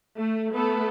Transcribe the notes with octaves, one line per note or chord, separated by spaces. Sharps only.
A3
A3 B3 A4